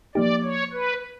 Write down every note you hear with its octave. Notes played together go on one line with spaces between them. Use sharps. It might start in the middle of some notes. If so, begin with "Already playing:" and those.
F3 A#3 D#4 G4 D5
C#5
B4